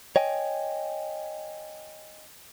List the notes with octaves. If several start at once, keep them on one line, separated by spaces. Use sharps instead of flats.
C#5 D#5 G5 G#5